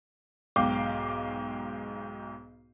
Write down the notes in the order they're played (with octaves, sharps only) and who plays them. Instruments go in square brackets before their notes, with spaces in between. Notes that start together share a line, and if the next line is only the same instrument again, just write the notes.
[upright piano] B1 G#2 F5 G5 D6